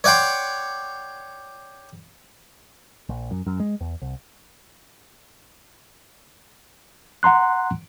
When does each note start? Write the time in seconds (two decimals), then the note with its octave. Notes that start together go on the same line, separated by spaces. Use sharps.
0.04 C#5 D5 F#5 G5 C6
3.09 A#1
3.31 F#2
3.47 F#2
3.60 G#3
3.81 E2
4.02 C2
7.23 F#5 A#5 C6 F#6